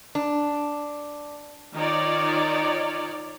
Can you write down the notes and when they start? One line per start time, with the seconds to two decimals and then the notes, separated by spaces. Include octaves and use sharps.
0.15 D4
1.74 D#3 D#4 F4 C#5 D5